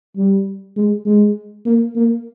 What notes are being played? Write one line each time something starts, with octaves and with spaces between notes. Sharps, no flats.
G3
G#3
G#3
A#3
A#3